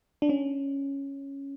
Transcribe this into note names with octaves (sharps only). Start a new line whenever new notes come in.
D4
C#4